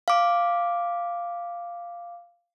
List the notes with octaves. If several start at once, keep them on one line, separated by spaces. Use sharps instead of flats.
F5 D6